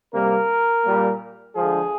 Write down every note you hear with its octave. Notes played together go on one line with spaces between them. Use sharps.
C3 G3 A#3 A#4
A#2 G3 A#3
D3 F3 G#3 G#4